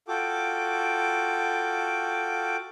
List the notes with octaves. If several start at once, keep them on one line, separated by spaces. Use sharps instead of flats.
F4 F#4 A4 G5 D6